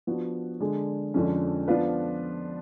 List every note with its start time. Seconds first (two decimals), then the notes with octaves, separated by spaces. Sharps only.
0.07 F3 B3 D4 F#4
0.60 D3 G#3 D4 G#4
1.14 F2 D3 F3 G#3 C#4
1.68 F3 B3 D4 F4 B4